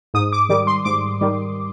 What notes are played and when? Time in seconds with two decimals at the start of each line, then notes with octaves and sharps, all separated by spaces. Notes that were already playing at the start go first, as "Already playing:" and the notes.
0.14 G#2 D#6
0.33 D6
0.49 D#3 G3 D6
0.67 C6
0.85 G#2 D6
1.21 D#3 G3